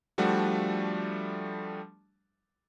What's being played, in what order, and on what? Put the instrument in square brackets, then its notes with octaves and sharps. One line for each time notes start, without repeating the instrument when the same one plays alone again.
[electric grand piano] F3 G3 A3 D4 F#4